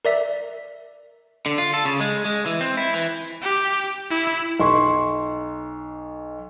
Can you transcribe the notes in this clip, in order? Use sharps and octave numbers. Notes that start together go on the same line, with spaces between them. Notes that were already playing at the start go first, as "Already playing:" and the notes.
A#4 D5 E5
D3
F4
A4
C#3
G#3
G#3
E3
C4
E4
E3
G4
E4
B1 C6 C#6